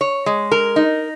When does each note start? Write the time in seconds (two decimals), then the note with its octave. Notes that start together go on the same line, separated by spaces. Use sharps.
0.01 C#5
0.26 G#3
0.51 A#4
0.76 D#4